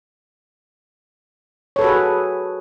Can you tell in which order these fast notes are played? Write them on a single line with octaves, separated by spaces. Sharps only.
C#5 A4 B4 F#4 G#4